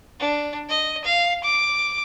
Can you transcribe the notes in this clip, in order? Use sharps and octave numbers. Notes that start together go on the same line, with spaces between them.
D4
D#5
F5
D6